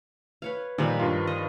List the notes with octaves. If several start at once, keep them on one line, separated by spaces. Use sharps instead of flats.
B4 C#5 F5
A#2 D#3 F3 G3 B4
G2 F4
D#5